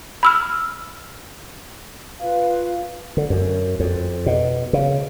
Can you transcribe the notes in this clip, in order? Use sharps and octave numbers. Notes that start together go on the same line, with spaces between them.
B5 E6 F6
F4 B4 F5
D3
F#2
F2
B2
C#3